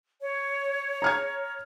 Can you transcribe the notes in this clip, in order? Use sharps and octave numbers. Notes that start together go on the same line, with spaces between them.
C#5
A#5 F6 G#6